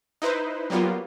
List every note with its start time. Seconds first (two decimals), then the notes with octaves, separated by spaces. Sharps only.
0.22 D#4 E4 B4 C5
0.70 F#3 G3 A#3 B3 F4